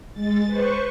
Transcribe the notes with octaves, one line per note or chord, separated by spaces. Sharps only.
G#3 A6
B4 C5 C#6